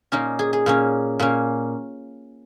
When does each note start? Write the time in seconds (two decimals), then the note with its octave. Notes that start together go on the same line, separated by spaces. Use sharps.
0.12 A#2 A#3 C#4 D#4
0.39 G#4
0.53 G#4
0.66 A#2 A#3 C#4
1.19 A#2 A#3 C#4